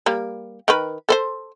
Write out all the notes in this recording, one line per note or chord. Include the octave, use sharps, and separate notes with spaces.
G3 A#3
D#3 A#4 B4
A4 B4 C5